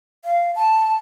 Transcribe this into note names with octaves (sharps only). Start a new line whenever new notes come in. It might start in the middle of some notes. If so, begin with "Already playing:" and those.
F5
A5